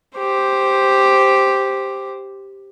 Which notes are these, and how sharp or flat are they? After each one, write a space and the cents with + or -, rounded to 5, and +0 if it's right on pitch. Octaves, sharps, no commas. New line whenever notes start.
G4 +0 C5 +0